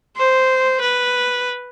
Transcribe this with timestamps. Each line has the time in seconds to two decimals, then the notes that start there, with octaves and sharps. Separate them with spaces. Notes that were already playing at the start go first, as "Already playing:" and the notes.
0.17 C5
0.81 B4